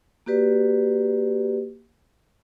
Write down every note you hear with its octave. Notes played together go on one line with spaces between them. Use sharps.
A#3 F#4 G4 B4 D5